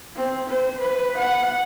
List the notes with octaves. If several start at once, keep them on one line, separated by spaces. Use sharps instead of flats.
C4
C5
B4
F#5